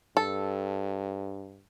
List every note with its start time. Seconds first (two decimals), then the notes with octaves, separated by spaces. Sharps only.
0.17 G2 A4